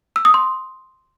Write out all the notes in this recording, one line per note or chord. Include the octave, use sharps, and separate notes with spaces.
E6
D#6
C6